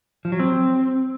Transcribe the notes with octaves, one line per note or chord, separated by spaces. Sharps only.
F3
F#3
C4